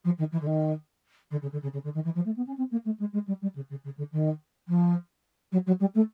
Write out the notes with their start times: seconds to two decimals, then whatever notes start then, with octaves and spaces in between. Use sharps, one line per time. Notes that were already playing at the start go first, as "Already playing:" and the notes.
0.04 F3
0.18 D#3
0.32 E3
0.41 D3
0.46 D#3
1.31 D3
1.41 C#3
1.52 D3
1.62 C#3
1.73 C#3
1.83 D3
1.94 D#3
2.04 E3
2.15 F3
2.25 A3
2.36 B3
2.46 C#4
2.57 C4
2.71 A#3
2.85 A3
2.99 G#3
3.13 G#3
3.27 G3
3.42 G3
3.55 C#3
3.69 C#3
3.84 C#3
3.97 D3
4.12 D#3
4.68 F3
5.52 F#3
5.66 F#3
5.80 G3
5.95 A3